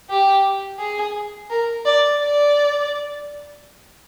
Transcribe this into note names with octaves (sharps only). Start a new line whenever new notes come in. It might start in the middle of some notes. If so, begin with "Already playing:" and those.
G4
G#4
A#4
D5
D5